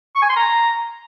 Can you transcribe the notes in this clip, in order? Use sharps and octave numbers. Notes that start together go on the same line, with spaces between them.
C#6
G#5
C6
A#5